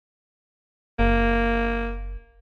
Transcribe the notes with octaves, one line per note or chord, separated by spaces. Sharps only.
F#1 A#3